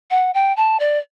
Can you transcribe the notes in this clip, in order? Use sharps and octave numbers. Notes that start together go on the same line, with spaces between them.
F#5
G5
A5
D5